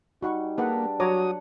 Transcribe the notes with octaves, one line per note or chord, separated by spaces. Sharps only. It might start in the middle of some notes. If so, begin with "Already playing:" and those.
G3 D#4 F#4 F#5 C#6
A#3 D4 G#4 B4 F#5
F#3 F#4 C#5 F#5 A#5 D6 D#6